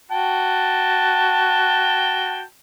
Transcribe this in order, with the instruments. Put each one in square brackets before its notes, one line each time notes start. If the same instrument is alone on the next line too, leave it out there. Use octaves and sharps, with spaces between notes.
[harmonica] F#4 G5 A5